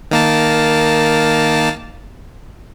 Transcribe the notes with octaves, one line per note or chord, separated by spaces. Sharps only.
D#3 A#3 A5